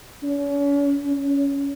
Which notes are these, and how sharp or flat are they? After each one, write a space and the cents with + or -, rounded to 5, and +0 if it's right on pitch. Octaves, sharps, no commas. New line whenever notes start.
C#4 +40
C#4 +15